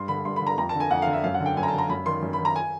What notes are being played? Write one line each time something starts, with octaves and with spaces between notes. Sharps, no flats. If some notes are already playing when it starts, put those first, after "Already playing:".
Already playing: G2 C6
D3 B5
G2 C6
D3 B5
A#5
F2 A#5
A5
D3
G#5
F2 F#5
F5
D3
E5
F#2 F5
F#5
D3
G5
F#2 G#5
A#5
A5
D3 A#5
F#2 B5
D#3 C6
F#2
B5
D#3
A#5
G#5